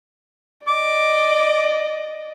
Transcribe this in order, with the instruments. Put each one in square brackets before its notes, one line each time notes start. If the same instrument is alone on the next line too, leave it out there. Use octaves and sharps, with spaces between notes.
[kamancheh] D5 D#5 [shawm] D6